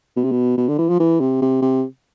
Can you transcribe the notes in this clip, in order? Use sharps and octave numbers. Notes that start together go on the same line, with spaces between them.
B2
C3
B2
B2
D3
E3
F3
E3
C3
C3
C3